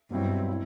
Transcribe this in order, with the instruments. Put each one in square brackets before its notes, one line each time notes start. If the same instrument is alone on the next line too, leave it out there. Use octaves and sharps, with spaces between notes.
[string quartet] G2 [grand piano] B2 F#3 C4 E4
[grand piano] E4